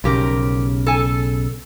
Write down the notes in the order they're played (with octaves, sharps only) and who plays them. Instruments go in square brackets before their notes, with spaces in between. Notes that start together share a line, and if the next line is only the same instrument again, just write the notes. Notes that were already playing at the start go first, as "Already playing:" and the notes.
[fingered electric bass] B1 C#3 [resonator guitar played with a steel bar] F3 G4 A#4
[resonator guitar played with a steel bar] A4 G#5